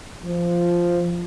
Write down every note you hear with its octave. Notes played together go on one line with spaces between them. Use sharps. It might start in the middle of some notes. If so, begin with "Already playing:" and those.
F3